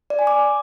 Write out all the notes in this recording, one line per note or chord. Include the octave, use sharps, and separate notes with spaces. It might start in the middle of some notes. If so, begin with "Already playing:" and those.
D5
G#5
D6